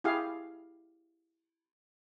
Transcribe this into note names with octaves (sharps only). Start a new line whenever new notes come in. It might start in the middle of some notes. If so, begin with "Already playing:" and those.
E4 G4 G#4 F5